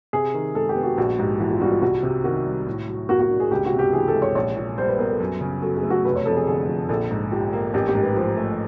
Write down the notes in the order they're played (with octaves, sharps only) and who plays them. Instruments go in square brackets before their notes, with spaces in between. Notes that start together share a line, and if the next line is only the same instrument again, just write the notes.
[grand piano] C3 [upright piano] G#4
[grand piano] D#3
[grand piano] G#3 [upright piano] A4
[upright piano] G4
[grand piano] B3
[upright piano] F#4
[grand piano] A#1 [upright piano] F#4
[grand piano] G#2 [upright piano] G4
[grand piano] E3 [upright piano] F#4
[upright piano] F4
[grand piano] G3 [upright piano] F#4
[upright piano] F4
[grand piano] C2 [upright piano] F#4
[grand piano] C3 [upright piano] G4
[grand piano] D#3 [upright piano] F#4
[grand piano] G3
A2
F#3
[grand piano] A#3 [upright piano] F#4
[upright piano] F#4
[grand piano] D4
[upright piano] G#4
[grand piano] C#2 [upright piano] G4
[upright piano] F#4
[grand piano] C3
[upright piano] G4
[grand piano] E3 [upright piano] G#4
[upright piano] A4
[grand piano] G#3
[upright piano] C#5
[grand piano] A#1 [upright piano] C#5
[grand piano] A#2
[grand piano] G3 [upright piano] C5
[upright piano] B4
[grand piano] B3 [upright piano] A#4
[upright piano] A4
[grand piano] F#2
C#3
[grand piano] F#3 [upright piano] A4
[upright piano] G#4
[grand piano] A3
[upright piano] F#4
[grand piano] F1 [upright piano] B4
[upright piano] C#5
[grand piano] F2 [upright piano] A4
[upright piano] G#4
[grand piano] D3 [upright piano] G#4
[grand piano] F3
[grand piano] A#1 [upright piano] A4
[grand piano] G#2
[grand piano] F3 [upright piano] G4
[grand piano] A#3
[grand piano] A1 [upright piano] G4
[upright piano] G4
[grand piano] G#2
[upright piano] B4
[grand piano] F3 [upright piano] C5
[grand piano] A3